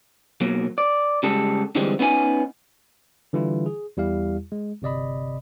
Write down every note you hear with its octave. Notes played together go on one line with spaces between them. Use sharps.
B2 F#3 A#3
D5
C#3 G3 G#3 G4 A4
D3 E3 G3 G#3 C4
B3 C#4 D#4 E4 G#5
D3 E3 G3 E4 F4
G#4
E2 G3 E4 G4 F5
G#3
G1 C3 D5 D#5 B5